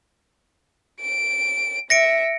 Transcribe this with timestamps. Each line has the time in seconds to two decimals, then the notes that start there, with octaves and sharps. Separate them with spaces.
1.01 D7
1.90 E5 A#6 C#7 D7